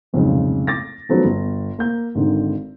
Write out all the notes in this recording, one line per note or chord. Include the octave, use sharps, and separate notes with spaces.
F1 B1 F2 G#2 C#3
D6 A6 A#6
D#3 F3 F#3 A3 B3 C#4
G1
A#3 G6
G#1 G#2 D3 D#3